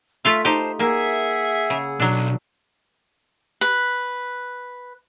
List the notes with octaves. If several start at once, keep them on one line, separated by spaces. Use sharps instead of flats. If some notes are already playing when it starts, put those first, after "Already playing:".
A3 F4 E5 F5 F6
D#4 G4 C5 A5
A#3 G#4 E5 F#5 E6
C#3
B1 F#3 D4
B4